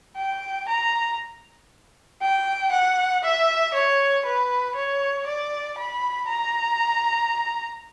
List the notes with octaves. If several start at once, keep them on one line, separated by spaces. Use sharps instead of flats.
G5
A#5
G5
F#5
E5
C#5
B4
C#5
D5
B5
A#5